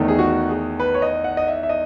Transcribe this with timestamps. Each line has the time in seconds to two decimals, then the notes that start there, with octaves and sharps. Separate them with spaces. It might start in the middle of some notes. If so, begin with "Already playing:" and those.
Already playing: E2 D#3 A3 D#4
0.08 G#4
0.19 F#4
0.49 G#4
0.80 B4
0.94 C#5
1.02 D#5
1.24 F#5
1.37 D#5
1.47 E5
1.63 E5
1.69 D#5